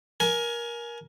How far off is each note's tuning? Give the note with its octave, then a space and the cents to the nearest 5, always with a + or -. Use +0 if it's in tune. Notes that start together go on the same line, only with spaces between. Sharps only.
A#4 +20 G#5 +25